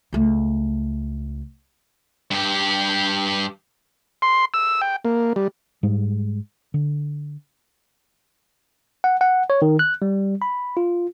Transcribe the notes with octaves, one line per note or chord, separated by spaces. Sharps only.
C#2 A3
G2 G4
C6
E6
G5
A#3
G3
G#2 G3 G#3
D3
F#5
F#5
C#5
D#3
F#6
G3
B5
F4